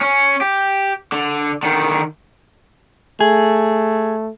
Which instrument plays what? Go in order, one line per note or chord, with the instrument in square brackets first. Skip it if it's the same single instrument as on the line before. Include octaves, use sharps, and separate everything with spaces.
[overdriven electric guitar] C#4
G4
D3
D3 D#3
[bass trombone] A3 [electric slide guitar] G#4